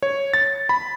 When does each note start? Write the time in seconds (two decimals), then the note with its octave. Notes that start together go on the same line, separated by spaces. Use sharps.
0.03 C#5
0.34 A6
0.69 B5